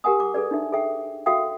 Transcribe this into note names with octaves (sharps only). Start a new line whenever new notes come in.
G4 A#4 F#5 G#5 D#6
D6
G#4 A4 B4 D5
D4 D#4 E5
G#4 A4 E5 G5
F#4 A4 E5 F5 G5 D#6